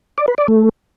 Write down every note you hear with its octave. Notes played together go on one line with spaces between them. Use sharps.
D5
B4
D5
A3